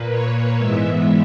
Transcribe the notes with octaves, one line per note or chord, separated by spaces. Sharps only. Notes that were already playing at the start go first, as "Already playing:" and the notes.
Already playing: A#2 A#3 B4
C#5
G#2 E3 G#3 B3 E5